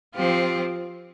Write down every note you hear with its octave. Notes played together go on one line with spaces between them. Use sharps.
F3 C4 F4 G4